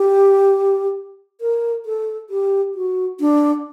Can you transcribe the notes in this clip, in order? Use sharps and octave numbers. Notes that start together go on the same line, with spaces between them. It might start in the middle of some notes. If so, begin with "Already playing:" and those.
Already playing: G4
A#4
A4
G4
F#4
D4